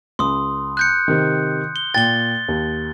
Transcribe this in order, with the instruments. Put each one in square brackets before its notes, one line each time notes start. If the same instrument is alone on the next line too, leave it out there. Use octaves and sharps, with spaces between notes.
[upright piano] C#2 [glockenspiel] C6 D#6
[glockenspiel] F#6 G6 C#7
[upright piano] C3 D#3
[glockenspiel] G7
[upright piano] A#2 G5 [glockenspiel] A6 G7
[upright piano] D#2